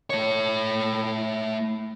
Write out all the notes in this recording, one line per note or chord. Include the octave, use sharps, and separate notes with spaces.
A3 C#5